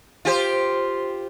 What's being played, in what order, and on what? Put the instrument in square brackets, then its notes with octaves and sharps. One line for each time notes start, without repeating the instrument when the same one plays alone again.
[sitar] F4 G4 C5